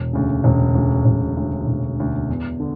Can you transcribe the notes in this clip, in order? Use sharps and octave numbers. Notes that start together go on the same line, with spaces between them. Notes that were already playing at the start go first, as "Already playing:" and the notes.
Already playing: E1
D2 C#3
E1
D2 C#3
E1
D2 C#3
E1
D2 C#3
E2
D3